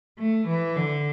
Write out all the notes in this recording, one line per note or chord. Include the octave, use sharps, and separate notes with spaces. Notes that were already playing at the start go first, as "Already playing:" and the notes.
A3
E3
D3